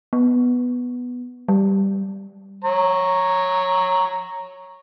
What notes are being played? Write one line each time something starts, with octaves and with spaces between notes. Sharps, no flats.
B3
G3
C#5 A#5